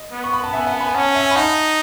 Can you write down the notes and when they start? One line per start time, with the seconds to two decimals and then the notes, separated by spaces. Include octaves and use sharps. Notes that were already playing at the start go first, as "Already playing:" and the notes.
Already playing: D#5
0.12 B3
0.24 C#6
0.33 B5
0.44 A5
0.53 B3 E5 G#5
0.67 F#5 A5
0.80 G#5 B5
0.94 C#4 F#5 A5
1.15 E5 G#5
1.31 B5
1.36 D#4 F#5 A5